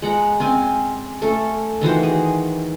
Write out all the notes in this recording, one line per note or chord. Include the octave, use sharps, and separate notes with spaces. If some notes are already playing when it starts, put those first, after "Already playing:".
G#3 F#5 A#5
C4 C#4 G#5
A3 C#4 A4
D#3 E3 F#4 C5
G#4